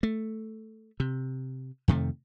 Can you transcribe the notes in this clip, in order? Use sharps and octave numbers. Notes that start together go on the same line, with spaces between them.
A3
C3
F2 C3 D#3 A3